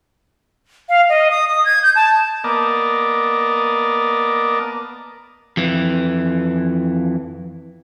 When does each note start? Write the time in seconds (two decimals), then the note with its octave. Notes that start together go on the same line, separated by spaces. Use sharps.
0.89 F5
1.09 D#5
1.31 D#6
1.49 D#6
1.65 G#6
1.83 G6
1.95 A5
2.44 A#3 B3 A#4 D5 D#5 A5
5.57 F2 E3